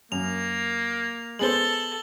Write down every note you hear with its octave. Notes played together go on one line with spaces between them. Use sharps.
F#2 A#3 F7
G#3 B3 A4 C5 A5 F#7 G7